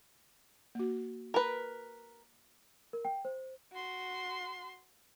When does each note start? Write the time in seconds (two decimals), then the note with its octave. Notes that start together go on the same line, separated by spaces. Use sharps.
0.75 A#3 F#4
1.34 A#4 B4
2.93 A#4
3.05 G5
3.25 C5
3.72 F#4 C6